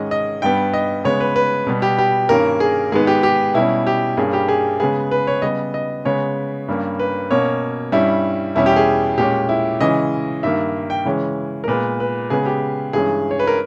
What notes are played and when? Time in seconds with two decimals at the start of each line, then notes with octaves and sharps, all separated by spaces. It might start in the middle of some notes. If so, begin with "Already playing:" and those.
Already playing: G#2 D#3 G#3 C#4 D#5
0.11 D#5
0.42 G2 G3 B3 G5
0.74 D#5
1.04 C#3 G#3 B3 C#5
1.20 B4
1.36 B4
1.67 B2 G3 B3
1.82 G4
1.98 G4
2.29 G2 D#3 A#3 C#4 A#4
2.60 G#4
2.92 G#2 D#3 G#3 B3 G#4
3.07 G4
3.23 G4
3.54 B2 G3 C#4 E4
3.87 G4
4.17 G2 G3 A#3 C#4 G#4
4.33 G4
4.48 G#4
4.80 C#3 G#3 B3 G#4
5.11 B4
5.27 C#5
5.42 C#3 G3 B3 D#5
5.74 D#5
6.05 C#3 G#3 B3 C#5
6.68 G2 G3 A#3 C#4
6.99 B4
7.31 B2 A#3 C#4 C#5
7.92 G2 G3 C#4 E4
8.55 E2 B2 G3 C#4 E4
8.66 G4
8.76 G#4
9.18 A#2 G#3 C#4 G4
9.49 E4
9.80 C#3 E3 G#3 C#4 D#5
10.43 G2 D#3 A#3 E5
10.90 G5
11.05 C#3 E3 G#3 C#4
11.64 A#4
11.68 A#2 G#3 B3 B4
12.00 B4
12.30 C#3 G#3 B3 G#4
12.46 G4
12.93 G2 E3 G#3 C#4 G#4
13.31 C#5
13.39 B4
13.47 A#4